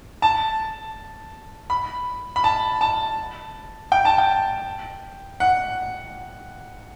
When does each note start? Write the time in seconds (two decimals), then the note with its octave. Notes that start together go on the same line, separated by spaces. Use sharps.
0.22 A5
1.70 B5
2.36 B5
2.44 A5
2.81 A5
3.92 G5
4.05 A5
4.18 G5
5.40 F#5